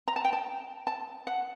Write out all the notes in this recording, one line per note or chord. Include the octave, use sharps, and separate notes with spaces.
A#5
A5
G5
A5
A5
F#5